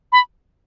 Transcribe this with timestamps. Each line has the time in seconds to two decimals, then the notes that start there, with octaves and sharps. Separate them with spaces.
0.12 B5